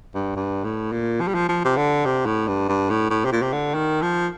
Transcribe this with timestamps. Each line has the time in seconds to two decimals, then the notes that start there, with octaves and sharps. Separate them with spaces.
0.15 G2
0.36 G2
0.64 A2
0.92 A#2
1.21 F3
1.28 G3
1.35 F3
1.49 F3
1.65 C3
1.77 D3
2.06 C3
2.26 A2
2.47 G2
2.69 G2
2.90 A2
3.10 A2
3.25 C3
3.32 A#2
3.42 C3
3.53 D3
3.74 D#3
4.02 F3